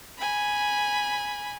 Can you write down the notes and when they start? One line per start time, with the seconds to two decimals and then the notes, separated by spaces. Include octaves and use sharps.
0.18 G#5 B5